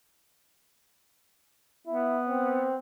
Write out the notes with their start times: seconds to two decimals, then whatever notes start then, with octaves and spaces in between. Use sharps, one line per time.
1.87 B3 E4
2.27 C4